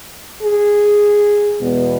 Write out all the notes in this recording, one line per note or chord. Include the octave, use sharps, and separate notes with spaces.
G#4
E2 B2 G#3 B3